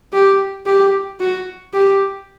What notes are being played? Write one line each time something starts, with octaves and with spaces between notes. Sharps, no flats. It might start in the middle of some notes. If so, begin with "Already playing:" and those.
G4
G4
F#4
G4